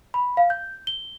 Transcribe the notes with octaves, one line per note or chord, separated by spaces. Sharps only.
B5
F5
G6
G7